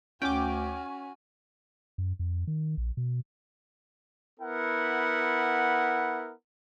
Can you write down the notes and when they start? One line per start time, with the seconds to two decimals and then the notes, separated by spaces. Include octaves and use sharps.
0.22 D2 C#4 F#4 G5 G#5 D6
1.98 F#2
2.19 F2
2.47 D#3
2.77 A#1
2.97 B2
4.40 B3 E4 A#4 F#5